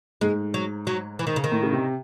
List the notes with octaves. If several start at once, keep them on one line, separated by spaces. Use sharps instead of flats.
G#2 G#3
F#3
F#3
E3
D#3
C#3
D#3
A2
C#3
C3